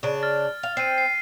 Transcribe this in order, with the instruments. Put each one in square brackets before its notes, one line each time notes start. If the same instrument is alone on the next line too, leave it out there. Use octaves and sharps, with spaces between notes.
[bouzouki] C#3 D4
[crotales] F6 A6
[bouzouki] F5
[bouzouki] C4 [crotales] C7 D#7
[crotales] C7